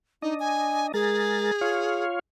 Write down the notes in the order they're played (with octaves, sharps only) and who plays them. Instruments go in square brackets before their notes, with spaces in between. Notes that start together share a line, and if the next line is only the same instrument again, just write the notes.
[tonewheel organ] D4 D#5 [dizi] D#4
[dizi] G#5
[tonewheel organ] G#3 A#4 A6 [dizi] G#4
[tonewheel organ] F4 C#5 F5